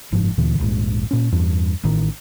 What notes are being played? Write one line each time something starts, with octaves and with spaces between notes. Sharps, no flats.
F#1 G#2 F3
D2 A#2 D3 E3
D#1 A#1 G#2
A#2 C#4
E2 G2
A1 A2 D#3